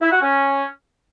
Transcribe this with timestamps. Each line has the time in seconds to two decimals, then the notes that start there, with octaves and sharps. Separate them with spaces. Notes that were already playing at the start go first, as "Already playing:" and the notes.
0.02 E4
0.12 F#4
0.22 C#4